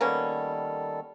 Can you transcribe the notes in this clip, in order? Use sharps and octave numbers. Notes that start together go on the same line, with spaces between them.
D#3 G3 A#3 B3 C#4 A4